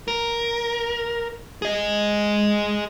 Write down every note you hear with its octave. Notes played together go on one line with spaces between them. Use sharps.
A#4
G#4 D#5